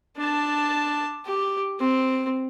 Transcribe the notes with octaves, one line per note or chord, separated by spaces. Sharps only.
D4 A5
G4
C4